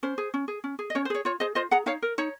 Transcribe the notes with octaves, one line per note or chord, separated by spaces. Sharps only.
C#4 C5
G#4
C#4
G#4
C#4
G#4
D#5
C#4 C#5
C5
G#4 C#5
F4 C#5
G#4 C5 D#5
F4 C5 D#5
G#4 F#5 A#5
D#4 C#5 F5
A#4
D#4 C#5